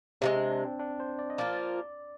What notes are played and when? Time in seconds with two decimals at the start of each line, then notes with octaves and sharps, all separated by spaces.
0.21 C3 F3 G#3 C4
0.36 D4
0.51 D4
0.65 C4
0.79 D4
1.00 C5
1.19 D5
1.30 D#5
1.38 F3 A#3 F4 D5